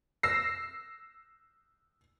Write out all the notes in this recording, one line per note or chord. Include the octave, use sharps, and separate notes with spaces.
E6 A#6 C7